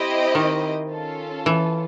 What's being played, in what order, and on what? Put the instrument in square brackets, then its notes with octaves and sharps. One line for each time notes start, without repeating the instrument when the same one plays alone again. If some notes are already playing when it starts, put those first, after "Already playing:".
Already playing: [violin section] C4 E4 G4 C5 D#5
[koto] D#3
[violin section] C#4 F4 A4
[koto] E3